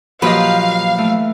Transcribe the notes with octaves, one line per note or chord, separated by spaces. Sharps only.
A#2 F3 F#3 G4 B4 D#5 F5
E3 A3